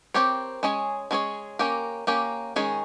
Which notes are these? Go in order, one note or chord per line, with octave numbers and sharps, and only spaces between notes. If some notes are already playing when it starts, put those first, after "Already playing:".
C4 G4 A#4 C#5
G#3 C#4 G#4 C#5
G#3 C#4 G#4 C#5
A#3 C#4 G4 A#4
A#3 C#4 G4 A#4
D#3 G#3 C#4 G#4